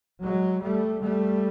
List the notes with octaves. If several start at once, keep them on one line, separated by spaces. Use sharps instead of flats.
F#3 G#3
G3 A3
G3 A3